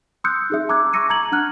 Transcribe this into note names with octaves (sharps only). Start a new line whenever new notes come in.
C6 D#6 E6 F#6 G6 C#7
D#4 G#4 E5
A5 A#5 D6 E6 F#6 G#6
C#6 D6 E6 A#6 C#7 D#7
A5 A#5 G#6 F#7
D4 F#5 F6 F#6